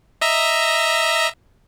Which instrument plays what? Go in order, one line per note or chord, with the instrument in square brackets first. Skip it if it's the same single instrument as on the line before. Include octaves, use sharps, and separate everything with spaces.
[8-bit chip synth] D#5 E5 A#5